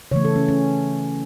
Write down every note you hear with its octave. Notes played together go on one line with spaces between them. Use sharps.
C#3 E3 A3 C#5
A4
C#4
C#4